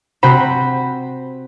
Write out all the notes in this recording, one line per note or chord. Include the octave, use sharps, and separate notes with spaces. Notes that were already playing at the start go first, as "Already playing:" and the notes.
C3 F#4 C5 B5